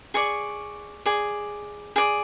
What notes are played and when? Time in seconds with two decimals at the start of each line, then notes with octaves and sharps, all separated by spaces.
0.14 G#4 D5 C#6
1.06 G#4 D5
1.96 G#4 D5